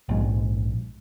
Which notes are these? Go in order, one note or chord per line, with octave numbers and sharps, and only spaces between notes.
A#1 G#2